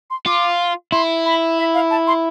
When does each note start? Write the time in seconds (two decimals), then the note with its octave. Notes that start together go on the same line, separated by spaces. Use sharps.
0.10 C6
0.26 F4 D6
0.92 E4 C6
1.25 B5
1.59 E5
1.74 F5
1.91 A5
2.07 C6